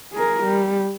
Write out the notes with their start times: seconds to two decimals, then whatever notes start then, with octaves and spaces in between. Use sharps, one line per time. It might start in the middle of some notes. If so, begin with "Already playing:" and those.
0.13 G#4 A#4
0.43 G3